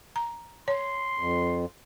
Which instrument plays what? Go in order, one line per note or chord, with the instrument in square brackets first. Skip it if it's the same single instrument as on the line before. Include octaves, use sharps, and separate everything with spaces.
[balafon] A#5
[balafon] C#5 [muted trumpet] C6
[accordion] F2